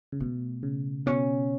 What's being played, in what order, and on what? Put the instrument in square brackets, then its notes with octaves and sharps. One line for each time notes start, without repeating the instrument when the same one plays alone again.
[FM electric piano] C#3
[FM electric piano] B2 [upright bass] A3
[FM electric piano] C#3
[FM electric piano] B2 [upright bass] C#4